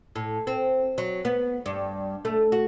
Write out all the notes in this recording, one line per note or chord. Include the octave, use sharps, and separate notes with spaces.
A2
C4
F#3
B3
G2
A3
F#4